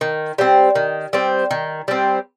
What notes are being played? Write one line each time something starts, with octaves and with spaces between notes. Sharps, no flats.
D#3
G3 C4
D#3
G3 C4
D#3
G3 C4